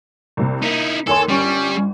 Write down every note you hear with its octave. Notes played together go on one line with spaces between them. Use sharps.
C2 C3
A#3 D#4 E4
D#2 A4 C#5 G#5 C6
G1 G3 C#4